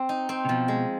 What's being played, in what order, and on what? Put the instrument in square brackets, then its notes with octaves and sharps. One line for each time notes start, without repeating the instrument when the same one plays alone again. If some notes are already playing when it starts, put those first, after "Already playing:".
Already playing: [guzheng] C4
D#4
C4
[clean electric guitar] C3
[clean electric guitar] B2 [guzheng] F3
[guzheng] G#3